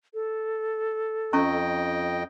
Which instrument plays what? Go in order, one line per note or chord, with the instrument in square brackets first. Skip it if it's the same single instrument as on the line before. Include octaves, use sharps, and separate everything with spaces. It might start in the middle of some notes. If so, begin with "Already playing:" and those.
[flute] A4
[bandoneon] F2 D#5 G5 [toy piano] C#4 A#5 C#6